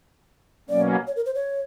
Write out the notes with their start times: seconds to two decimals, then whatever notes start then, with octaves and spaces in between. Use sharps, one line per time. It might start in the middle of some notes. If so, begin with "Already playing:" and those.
0.69 B2 F#3 A#3 C#4 D5
1.07 C#5
1.16 A#4
1.26 C5
1.35 C#5